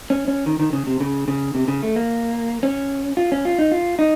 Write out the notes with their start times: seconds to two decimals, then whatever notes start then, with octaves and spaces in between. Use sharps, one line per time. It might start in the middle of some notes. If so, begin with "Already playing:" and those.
0.10 C#4
0.28 C#4
0.46 D#3
0.60 D#3
0.73 C#3
0.87 C3
1.00 C#3
1.28 C#3
1.55 C3
1.68 C#3
1.83 A3
1.96 A#3
2.63 C#4
3.17 F4
3.32 C#4
3.45 F4
3.59 D#4
3.72 F4
3.99 D#4